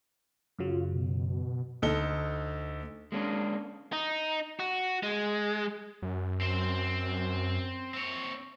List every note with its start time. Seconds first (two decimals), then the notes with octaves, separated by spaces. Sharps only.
0.59 F#2 C#3 F#3 F4
0.93 B2
1.82 D2 D#4 A4 G7
3.12 G#3 A#3 C#4 D4
3.93 D#4
4.59 F#4
5.03 G#3
6.02 F#2
6.41 C4 C5
7.94 C4 C#5